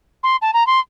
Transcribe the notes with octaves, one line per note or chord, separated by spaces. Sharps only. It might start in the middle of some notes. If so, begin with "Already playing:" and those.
C6
A5
A#5
C6